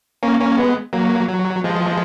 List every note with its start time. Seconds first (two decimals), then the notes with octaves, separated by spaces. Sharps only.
0.23 A#3 C#4
0.40 A#3 C#4
0.58 G#3 B3
0.93 F#3 A#3
1.28 F#3
1.64 F3 G#3